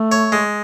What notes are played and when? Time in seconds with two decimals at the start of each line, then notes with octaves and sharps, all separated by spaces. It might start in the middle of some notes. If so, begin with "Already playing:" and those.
Already playing: A3
0.12 C#5
0.32 G#3